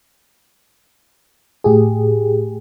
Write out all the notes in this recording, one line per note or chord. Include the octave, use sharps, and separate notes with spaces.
A2 G4 G#4